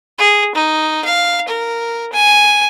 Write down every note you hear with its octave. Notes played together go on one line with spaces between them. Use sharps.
G#4
D#4
F5
A#4
G#5